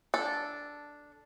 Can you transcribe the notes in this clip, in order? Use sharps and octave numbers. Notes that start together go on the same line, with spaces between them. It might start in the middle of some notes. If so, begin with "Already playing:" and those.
D4 A4